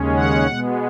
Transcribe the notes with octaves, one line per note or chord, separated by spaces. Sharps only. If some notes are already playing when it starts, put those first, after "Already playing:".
Already playing: D#2 C#3 G#3 C#4
F#5
B2 G#3 B3